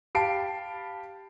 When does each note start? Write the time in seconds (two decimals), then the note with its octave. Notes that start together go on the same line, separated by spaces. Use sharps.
0.15 G4 F5 A5 B5 C7 D7